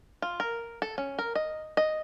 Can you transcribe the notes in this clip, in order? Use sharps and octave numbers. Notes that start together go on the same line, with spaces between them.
F4
A#4
A4
C#4
A#4
D#5
D#5